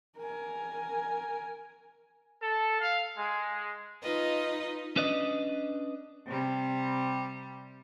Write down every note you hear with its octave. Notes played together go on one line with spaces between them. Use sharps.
A#4 G#5
A4
F5
G#3
D#4 F4 B4 D#5
C#4 D4 B4 D5 D#5
C3 G3